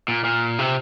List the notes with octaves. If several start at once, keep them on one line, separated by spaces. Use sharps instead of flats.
A#2
A#2
C3